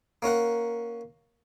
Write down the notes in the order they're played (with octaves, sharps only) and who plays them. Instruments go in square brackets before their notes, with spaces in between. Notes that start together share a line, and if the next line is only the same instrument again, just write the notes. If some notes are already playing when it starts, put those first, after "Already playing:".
[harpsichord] A#3 C#4 A#4 F#5